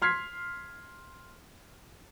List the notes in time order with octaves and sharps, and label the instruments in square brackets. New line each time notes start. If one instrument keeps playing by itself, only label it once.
[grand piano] C6 F6 G#6 B6 C7